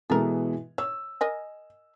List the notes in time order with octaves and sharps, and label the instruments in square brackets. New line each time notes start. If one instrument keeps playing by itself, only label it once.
[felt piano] B2 E3 G#3 [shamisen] A4 A#4
[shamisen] C#5 [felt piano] E6
[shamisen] A#4 D#5 G#5